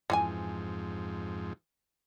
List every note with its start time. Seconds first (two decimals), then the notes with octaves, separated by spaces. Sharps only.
0.10 F2 G#2 E3 F4 G#5